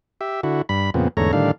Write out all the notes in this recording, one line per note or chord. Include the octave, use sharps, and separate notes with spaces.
G4 E5
D3 E4 F#4
G2 B5
F2 A#2 C#3 B3 C4
E2 G#2 D3 A3 C#5 A#5
A2 D3 D#3 G3 D4 F5